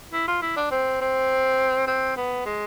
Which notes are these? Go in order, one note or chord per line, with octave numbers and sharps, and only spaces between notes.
E4
F4
E4
D4
C4
C4
C4
B3
G#3